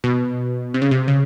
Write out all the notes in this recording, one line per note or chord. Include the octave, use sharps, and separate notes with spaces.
B2
C3
C#3
C3
C#3